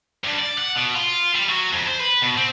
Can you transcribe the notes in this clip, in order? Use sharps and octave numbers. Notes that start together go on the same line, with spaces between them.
G2
D5
F#5
B2
F4
G3
F#3
F2
C5
B4
B2
C4